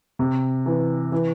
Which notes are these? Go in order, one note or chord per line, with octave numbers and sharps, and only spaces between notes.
C3
E3
E3